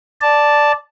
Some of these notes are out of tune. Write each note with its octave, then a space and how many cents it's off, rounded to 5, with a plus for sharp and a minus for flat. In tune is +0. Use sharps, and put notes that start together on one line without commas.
D5 +0 A5 +0